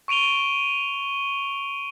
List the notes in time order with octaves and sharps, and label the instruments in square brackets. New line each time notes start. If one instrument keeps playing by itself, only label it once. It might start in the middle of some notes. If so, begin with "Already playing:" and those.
[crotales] C#6 D7 D#7 F7 G7